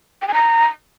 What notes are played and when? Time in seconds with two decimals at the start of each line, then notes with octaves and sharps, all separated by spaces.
0.22 G5
0.28 G#5
0.34 A#5